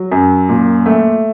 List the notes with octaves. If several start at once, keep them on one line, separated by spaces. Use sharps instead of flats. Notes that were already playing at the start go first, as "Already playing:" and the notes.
Already playing: F#3
F#2
A#2
A3